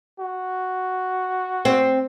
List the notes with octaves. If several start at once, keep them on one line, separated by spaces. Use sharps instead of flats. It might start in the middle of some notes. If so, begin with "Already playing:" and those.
F#4
C4